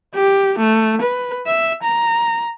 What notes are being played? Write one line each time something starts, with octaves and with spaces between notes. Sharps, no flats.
G4
A3
B4
E5
A#5